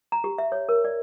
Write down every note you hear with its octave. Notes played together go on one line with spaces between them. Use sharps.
A#5
G4
E5
C#5
A#4
D5